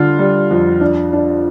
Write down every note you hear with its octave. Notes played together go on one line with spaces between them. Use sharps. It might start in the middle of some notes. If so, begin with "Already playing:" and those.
Already playing: D3 G3 F4
G3
F2
D4
D4